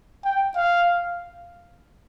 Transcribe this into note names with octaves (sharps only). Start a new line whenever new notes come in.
G5
F5